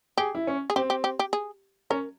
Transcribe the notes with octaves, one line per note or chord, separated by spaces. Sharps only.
G4 G#4
E4
C#4
G#4
C4 G4
G4
G4
G4
G#4
C#4 A#4